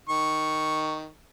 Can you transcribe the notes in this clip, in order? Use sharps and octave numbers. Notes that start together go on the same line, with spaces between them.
D#3 C#6